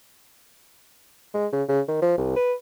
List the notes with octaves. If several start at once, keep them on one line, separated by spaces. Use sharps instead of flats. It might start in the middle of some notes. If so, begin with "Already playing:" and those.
G#3
C#3
C#3
D#3
F3
C2
B4